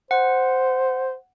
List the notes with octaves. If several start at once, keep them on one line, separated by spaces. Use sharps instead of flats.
C5 F#5